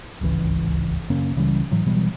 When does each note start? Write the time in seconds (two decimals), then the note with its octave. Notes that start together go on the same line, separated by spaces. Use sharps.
0.21 D1 G#1 C#2 E3
1.10 F#2 C#3 A#3 C#4
1.36 C#2 C#3 E3 G3
1.71 A2 E3 F#3
1.86 B2 E3 F#3 G3